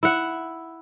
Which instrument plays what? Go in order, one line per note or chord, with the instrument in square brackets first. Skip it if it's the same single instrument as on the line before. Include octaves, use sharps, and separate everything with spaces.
[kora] E4 F#5